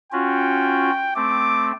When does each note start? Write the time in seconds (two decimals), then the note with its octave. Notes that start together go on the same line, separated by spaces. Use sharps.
0.12 C#4 F4 F#4 G5
1.16 A3 C4 D6